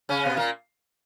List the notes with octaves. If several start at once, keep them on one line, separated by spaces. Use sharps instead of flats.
C#3 C#4
B2 B3
A#2 A#3